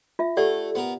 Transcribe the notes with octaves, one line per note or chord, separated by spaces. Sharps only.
F4 E5
A3 G4 A4 D5 F#5
B3 A#4